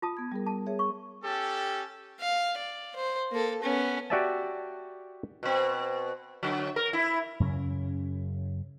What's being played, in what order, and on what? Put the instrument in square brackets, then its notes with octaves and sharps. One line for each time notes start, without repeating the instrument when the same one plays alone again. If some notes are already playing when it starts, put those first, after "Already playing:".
[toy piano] F4 A5 D#6
[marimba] B3 G#6
G3 G#4 A#4
[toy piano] A5
[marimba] G#4 C#5 E5
[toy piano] C#6
[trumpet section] C#4 A4 [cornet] G4
[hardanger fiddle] F5
D5
C5
A#3 A4
B3 C#4
[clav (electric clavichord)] F#4 G4 D5 E5 G#5 A5
[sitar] B2 C4
D3 F#3
A#4
E4
[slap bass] F#2 C#3 C#4